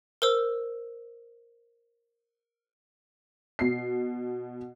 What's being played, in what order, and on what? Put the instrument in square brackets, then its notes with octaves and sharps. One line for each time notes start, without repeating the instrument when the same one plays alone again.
[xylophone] A#4 C5 E6
[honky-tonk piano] B2 C7